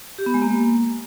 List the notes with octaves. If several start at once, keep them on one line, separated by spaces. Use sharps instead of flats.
G4
B3
G#3
A#3